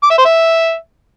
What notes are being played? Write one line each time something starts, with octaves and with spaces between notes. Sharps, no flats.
D6
E5
C5
E5